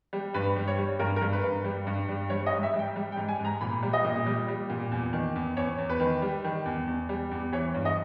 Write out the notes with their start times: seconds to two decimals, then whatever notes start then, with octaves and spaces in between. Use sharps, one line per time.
0.13 G3
0.34 G2 B4
0.56 G3
0.68 C#5
0.78 G3
0.99 G2 A#4
1.16 A#4
1.22 G2
1.33 B4
1.43 G2
1.65 G3
1.87 G2
2.09 G3
2.30 G3 C#5
2.46 D#5
2.52 G#2
2.63 E5
2.74 G3
2.79 G5
2.96 G3
3.12 G5
3.17 G#2
3.29 G#5
3.40 G#2
3.45 A#5
3.61 A#2 B5
3.83 G3
3.93 D#5
4.05 A#2
4.26 G3
4.48 G3
4.70 A#2
4.92 E2
5.13 D#3
5.35 E2
5.57 E2 C#5
5.78 E2
5.90 B4
6.00 D#3
6.22 G3
6.44 D#3
6.66 E2
6.87 E2
7.09 G3
7.31 E2
7.53 E3 C#5
7.74 G2
7.85 D#5